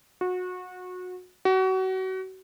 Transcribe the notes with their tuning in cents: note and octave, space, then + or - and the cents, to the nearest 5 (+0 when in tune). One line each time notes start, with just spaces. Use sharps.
F#4 -25
F#4 +30